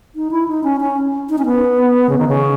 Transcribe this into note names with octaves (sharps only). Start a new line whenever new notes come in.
D#4
E4
D#4
C#4
C#4
D#4
C#4
B3
C#3
D#3
C#3